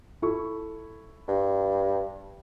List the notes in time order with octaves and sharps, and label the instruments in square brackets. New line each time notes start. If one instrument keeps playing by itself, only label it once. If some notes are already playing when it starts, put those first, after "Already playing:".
[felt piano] E4 A4 C#6
[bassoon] G2